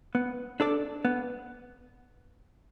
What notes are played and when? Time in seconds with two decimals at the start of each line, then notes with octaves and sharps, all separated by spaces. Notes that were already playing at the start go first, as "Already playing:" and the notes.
0.15 B3
0.60 D4 A4 D5
1.05 B3